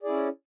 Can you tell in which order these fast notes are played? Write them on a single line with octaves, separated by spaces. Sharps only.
G#4 D5 E4 C#4